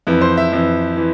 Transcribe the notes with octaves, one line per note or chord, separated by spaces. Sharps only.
F2 E3
C5
E5
F2 E3
E3